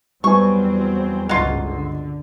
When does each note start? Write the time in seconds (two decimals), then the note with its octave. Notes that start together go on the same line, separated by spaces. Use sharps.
0.24 E2 F#3 G3 B3 C4 G#5 C#6
1.29 G1 C#2 G#2 F#3 F4 D#5 C6
1.65 D3